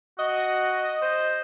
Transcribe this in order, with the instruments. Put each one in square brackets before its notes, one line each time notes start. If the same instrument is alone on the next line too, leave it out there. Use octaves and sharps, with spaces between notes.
[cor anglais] F#4 [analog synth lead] D#5
[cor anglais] C5